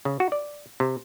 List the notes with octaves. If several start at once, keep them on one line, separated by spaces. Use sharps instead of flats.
C#3
F#4
D5
C3